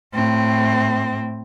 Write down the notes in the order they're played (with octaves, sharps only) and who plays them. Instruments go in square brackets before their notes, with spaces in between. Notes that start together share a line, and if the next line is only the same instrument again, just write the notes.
[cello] A2 C4